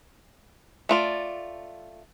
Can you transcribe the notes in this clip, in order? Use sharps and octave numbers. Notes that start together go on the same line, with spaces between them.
A3 F4 D5